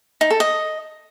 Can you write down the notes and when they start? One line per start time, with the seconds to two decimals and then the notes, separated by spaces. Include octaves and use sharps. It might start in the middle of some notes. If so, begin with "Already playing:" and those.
0.21 D#4
0.31 A4
0.40 D#5